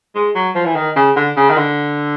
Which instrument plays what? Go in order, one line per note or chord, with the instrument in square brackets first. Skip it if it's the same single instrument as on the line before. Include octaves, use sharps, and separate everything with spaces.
[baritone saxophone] G#3
F#3
F3
E3
D#3
C#3
D3
C#3
D#3
D3